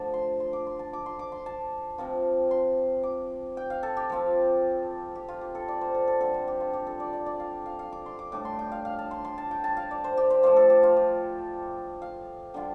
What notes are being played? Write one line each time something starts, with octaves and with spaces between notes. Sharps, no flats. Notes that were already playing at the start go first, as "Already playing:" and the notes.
Already playing: D3 F3 A3 A5
C6
C6
D6
C6
A5
D6
C6
D6
C6
A5
C3 F3 C4 F4
C6
D6
G5
F5
A4
G4
F3 C4 F4
G4
F4
G4
A4
D5
C5
A4
A4
D3 G3 D4 A4
C5
G4
F4
G4
A4
D5
D5
D5
F5
F5
F5
D6
C6
D6
A2 G3 D4 D6
C6
G5
F5
F5
A5
C6
C6
A5
G5
A5
F5
D5
C5
G4
C5
F3 A3 F4 C5
A4
G4
F4
G4
F5
D3 G3 D4 F4 G5